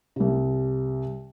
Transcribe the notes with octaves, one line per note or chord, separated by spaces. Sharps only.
C2 C3